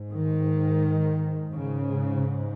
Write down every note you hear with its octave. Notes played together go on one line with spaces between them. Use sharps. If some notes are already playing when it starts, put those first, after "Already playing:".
Already playing: G#2
D#3
G#2 C#3